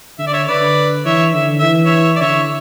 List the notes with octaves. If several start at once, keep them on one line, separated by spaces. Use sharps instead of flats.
D3 E5
D5
C#5 E5
D3 B4 D5
E3 C#5 E5
D3 E5
E3 E5
C#5 E5
D5
D3 C#5 E5